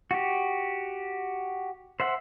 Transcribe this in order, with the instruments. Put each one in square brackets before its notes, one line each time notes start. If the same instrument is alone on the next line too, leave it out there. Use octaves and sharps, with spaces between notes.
[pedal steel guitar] F#4 G4
C5 E5 F#5